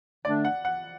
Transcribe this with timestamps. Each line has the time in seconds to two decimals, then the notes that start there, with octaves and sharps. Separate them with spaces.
0.24 D3 A3 D4 D5
0.45 F#5
0.65 F#5